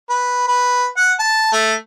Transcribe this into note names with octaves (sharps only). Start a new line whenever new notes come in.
B4
B4
F#5
A5
A3